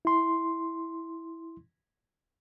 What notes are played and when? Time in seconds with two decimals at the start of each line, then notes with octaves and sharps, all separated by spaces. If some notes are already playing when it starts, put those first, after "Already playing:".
0.05 E4 C6